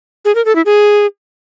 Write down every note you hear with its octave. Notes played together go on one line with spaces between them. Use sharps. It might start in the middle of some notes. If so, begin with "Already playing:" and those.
G#4
A#4
A4
E4
G#4